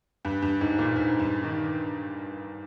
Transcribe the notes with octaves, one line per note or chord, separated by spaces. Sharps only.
G2
G2
G#2
A#2
G#2
G2
D#3